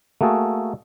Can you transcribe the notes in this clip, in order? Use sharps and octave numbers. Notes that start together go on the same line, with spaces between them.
A3 A#3 F#4 G#4 A4